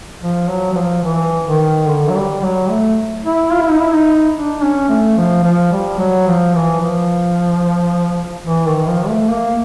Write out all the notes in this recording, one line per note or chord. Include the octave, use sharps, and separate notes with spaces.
F3
F#3
F#3
F3
E3
D#3
D3
F#3
G3
F#3
A3
E4
F4
E4
D#4
E4
D#4
D4
C#4
A3
F3
F3
G3
F#3
F3
E3
F3
E3
D#3
F3
A3
A#3